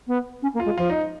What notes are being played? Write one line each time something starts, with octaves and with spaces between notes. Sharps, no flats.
B3
C#4
A#3
F4
G#3
F3 F4
D#4